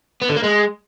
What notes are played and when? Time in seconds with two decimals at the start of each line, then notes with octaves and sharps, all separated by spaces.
0.22 B3
0.29 D3
0.36 A#3
0.44 G#3